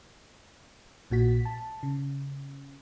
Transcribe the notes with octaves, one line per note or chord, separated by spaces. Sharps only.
A#1 A#2 F#4 B6
A5
C#3